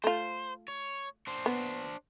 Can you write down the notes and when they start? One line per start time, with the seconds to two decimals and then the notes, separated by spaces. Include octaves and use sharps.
0.04 A3 F4 C5
0.68 C#5
1.27 D4 C5
1.46 B3